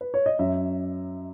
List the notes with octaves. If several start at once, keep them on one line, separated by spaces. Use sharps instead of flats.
B4
C#5
D#5
F#2 E5